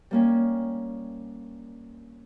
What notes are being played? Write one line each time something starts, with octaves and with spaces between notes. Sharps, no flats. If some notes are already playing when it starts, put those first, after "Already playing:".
G3 A#3 C#4